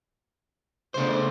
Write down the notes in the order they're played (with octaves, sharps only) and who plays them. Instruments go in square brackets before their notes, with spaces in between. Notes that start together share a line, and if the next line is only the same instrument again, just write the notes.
[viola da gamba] C#3 B3 D4 [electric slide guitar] A3 C5